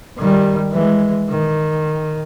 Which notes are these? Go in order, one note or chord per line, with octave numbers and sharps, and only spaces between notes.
D#3 G3
E3 G#3
D#3